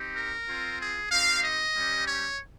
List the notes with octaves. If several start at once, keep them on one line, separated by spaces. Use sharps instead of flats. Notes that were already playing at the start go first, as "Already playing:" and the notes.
Already playing: C4 D#4 G4
A#4
C4 F4
G#4
C4 D#4 G4 F5
D#5
G3 C#4 G4
C#5